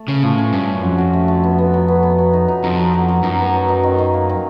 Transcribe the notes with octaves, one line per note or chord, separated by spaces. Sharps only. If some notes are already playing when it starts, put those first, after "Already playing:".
Already playing: A3
C#3 C#4
A2 F3
C#4
G2 C#4
C#4
F#2
F2 F#4
F#4
A3
A3
B3
B3
F#3
B3
B3
F#3
D#4
D#4
F2 D#4
F#3
F#3
F#3
F#2 D#4
B3
F#3
D#4
D#3
D#3
A#3
D#3